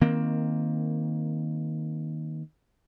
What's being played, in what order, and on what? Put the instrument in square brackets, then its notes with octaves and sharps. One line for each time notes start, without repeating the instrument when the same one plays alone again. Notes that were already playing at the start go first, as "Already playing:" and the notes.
[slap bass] D#3 A#3 C4